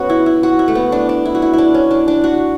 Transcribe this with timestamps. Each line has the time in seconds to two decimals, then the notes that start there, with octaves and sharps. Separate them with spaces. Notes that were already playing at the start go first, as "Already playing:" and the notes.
Already playing: A3 B3 C#4 F#4
0.09 E4
0.26 E4
0.43 F#4
0.59 E4
0.68 A3
0.75 B3
0.92 D4
1.09 D4
1.25 E4
1.35 F#4
1.42 E4
1.53 D4 E4
1.74 C#4
1.91 D4
2.08 D4
2.24 F#4